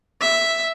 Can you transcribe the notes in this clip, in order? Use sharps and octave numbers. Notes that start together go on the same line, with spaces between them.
E5